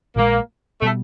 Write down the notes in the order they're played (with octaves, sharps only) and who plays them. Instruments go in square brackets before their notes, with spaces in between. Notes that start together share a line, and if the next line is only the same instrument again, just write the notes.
[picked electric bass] A#1 A#2 F3 G#3 [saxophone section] A#3
[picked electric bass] B2 G3 [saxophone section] A3